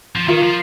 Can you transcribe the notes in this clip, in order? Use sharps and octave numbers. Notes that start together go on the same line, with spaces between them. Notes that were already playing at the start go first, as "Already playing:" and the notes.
F3
D#3 F4 A#4 F5
F3